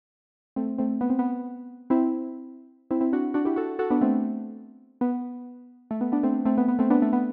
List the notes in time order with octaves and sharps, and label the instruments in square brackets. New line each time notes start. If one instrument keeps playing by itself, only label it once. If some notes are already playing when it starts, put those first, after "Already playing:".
[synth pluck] A3 C4
A3 C4
B3
C4
B3
C4 E4
C4 E4
C4 E4
D4 F#4
D4 F#4
E4 G4
F#4 A4
F#4 A4
B3 D4
A3 C4
B3
A3
B3
B3 D4
A3 C4
A3 C4
B3
B3
A3 C4
B3 D4
A3
B3